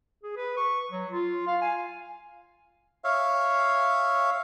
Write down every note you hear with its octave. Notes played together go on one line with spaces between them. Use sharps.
G#4
B4
C#6
F#3
F4
F5
G#5
C#5 E5 F5